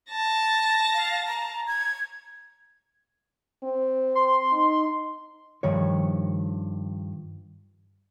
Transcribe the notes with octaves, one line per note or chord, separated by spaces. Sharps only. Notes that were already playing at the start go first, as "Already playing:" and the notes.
A5 A#6
F5
A#5
G#6
C4
C6
D#4
G2 D#3 F3 C#5